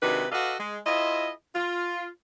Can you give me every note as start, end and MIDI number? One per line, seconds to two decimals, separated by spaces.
0.03 0.26 48
0.03 0.26 51
0.03 0.26 56
0.03 0.26 62
0.03 0.26 66
0.03 0.26 71
0.32 0.54 66
0.32 0.54 69
0.32 0.54 71
0.32 0.54 74
0.32 0.54 75
0.32 0.54 77
0.60 0.77 56
0.87 1.30 64
0.87 1.30 65
0.87 1.30 68
0.87 1.30 72
0.87 1.30 75
1.55 2.08 65